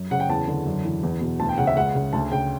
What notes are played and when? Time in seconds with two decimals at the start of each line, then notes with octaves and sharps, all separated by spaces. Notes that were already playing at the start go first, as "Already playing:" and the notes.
Already playing: F#2
0.11 C#3 F#5
0.20 G5
0.29 E2 A5
0.48 D3
0.66 F#2
0.85 E3
1.03 E2
1.21 B2
1.40 D2 A5
1.49 G5
1.58 C#3 F#5
1.67 E5
1.77 C#2 F#5
1.95 C#3
2.13 D2 A5
2.32 C#3 G5